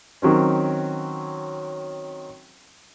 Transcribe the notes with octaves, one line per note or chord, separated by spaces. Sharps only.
D#3 F#3 C4 C#4